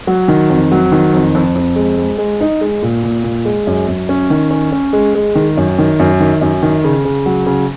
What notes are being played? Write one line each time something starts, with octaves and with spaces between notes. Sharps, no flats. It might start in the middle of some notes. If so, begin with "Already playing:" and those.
F#3
D#3
F2
F#3
D#3
F2
F2
F2
G#3
G#3
G#3
D#4
G#3
A#2
A#2
A#2
G#3
F#2
F#2
C#4
D#3
C#4
C#4
G#3
G#3
D#3
F#2
D#3
F#2
D#3
F#2
D#3
C#3
C#3
F#3
C#3